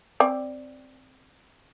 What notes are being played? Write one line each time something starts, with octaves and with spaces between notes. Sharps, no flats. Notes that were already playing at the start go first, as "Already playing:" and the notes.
C4 D5